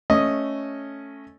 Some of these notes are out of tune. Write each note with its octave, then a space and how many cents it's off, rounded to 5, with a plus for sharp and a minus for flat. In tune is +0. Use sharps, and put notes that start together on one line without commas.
A3 +0 C#4 +0 D#5 +0